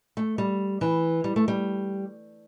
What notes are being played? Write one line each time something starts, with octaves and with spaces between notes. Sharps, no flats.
A3
G3
E3
G3
A3
G3